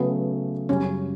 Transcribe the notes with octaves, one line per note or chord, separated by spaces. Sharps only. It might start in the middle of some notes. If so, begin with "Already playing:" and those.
Already playing: C#3 F#3 A3 B3
F#2 C#3 G3 C#4